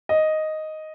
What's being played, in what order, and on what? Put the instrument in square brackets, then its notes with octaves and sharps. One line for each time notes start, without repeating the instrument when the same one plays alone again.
[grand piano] D#5